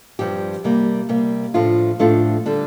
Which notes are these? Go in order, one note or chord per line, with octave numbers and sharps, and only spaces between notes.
G2 F3 C4 G4
C3 G3 A#3
C3 G3 A#3
A2 F3 A3 D4 F4
A2 F3 A3 D4 F4
D3 G3 D4